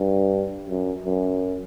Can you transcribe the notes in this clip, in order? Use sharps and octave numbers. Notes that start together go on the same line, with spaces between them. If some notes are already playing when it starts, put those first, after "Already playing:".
Already playing: G2
F#2
F#2